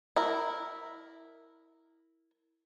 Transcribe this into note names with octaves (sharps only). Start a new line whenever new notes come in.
E4 A#4